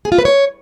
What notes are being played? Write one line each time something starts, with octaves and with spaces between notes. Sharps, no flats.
G#4
F4
B4
C#5